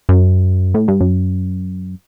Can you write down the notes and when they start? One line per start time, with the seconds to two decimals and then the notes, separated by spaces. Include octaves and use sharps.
0.09 F#2
0.74 A2
0.88 G2
1.01 F#2